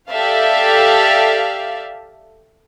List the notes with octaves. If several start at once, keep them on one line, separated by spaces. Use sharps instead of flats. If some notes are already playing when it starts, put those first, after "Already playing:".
G4 A4 D5 E5 F5